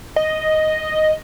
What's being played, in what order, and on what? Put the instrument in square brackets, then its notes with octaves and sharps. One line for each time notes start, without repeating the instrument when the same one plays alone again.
[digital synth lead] D#5